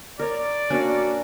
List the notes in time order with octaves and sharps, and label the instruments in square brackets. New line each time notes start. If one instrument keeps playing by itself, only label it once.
[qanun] A#4 C#5 [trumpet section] D5
[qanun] A#3 C#4 D4 [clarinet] F#4